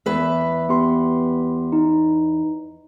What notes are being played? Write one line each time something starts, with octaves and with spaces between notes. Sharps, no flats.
E2 B4 E5
B3 G4 C6
D#4